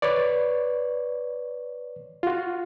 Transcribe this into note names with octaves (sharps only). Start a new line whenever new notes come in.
B4 C#5 D5
F4 F#4